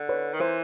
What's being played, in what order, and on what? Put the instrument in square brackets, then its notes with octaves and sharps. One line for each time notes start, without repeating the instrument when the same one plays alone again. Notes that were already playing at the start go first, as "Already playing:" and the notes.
Already playing: [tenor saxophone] D3
[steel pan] B4 C#5
[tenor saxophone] D#3
[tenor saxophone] E3 [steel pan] A#4 C5